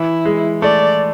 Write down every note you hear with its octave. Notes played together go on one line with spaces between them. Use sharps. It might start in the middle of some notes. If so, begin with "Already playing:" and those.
Already playing: E3 E4
G#3
A3 D5